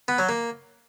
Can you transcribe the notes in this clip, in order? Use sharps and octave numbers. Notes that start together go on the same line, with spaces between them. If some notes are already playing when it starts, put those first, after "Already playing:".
B3
F#3
A#3